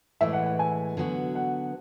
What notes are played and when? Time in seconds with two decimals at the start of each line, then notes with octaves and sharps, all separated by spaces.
0.21 A2 E3 G#3 E5
0.33 F#5
0.46 F#5
0.59 G#5
0.97 D3 F#3 B3 F#4
1.35 F#5